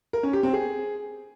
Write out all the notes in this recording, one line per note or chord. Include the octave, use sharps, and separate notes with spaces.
A#4
C#4
G4
C4
G#4